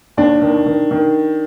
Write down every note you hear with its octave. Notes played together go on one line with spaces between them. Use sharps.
D#2 D4
D#3
D#3
D#3